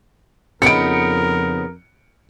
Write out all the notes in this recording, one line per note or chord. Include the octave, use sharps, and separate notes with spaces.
F2 C#3 B3 D#4 A#4 C#7 D7